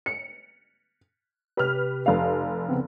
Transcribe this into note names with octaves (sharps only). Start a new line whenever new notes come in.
C#7
C3 G4 B4 F6
F1 F5
C#3 B3 C4